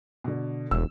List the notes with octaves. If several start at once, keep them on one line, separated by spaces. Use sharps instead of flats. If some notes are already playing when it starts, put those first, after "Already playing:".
B2 D3
E1 E6